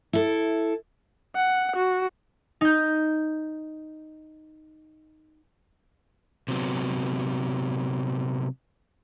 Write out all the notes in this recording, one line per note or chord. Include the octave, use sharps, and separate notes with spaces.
E4 A4
F#5
F#4
D#4 G6
C3 F#3 B3